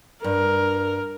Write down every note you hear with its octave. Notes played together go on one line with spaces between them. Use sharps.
G2 A#4